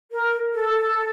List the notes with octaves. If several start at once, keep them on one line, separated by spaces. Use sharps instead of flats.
A#4
A4